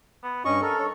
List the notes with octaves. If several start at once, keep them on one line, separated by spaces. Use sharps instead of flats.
B3
G2 C#4 D#5 C#6
A4 A#4
C#5